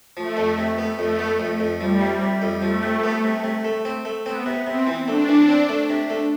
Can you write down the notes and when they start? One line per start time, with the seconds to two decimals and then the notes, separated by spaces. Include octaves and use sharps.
0.17 F3 A3
0.37 F2
0.58 C3
0.78 B3
0.99 F2 A3
1.19 B3
1.40 F2
1.60 F2
1.80 F3 G3
2.01 C3
2.21 C3
2.42 F2
2.62 F3 A3
2.83 C3
3.04 B3
3.24 C3
3.44 C3
3.65 A3
3.85 C4
4.05 A3
4.26 B3 C4
4.46 C3
4.67 C3 C4
4.87 E3
5.07 A3 D4
5.28 E3
5.49 C4
5.69 A3
5.90 C3
6.10 A3